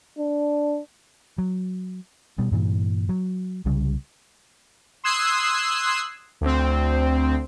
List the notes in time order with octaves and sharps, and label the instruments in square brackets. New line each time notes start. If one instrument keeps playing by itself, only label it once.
[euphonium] D4
[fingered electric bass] F#3
B2 G3
G2 A#2 E3
F#3
C2 C#3 G3
[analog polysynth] C6 D#6 E6 F#6 G#6 C7
D2 C4